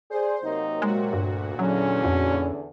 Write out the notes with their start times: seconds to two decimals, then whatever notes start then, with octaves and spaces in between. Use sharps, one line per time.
0.10 G#4 C5 D5
0.44 C3 F#3 A#3 D#4
0.82 A#2 G#3 F#4
1.13 D2 G2
1.59 E2 D3 F#3 C#4
2.04 F2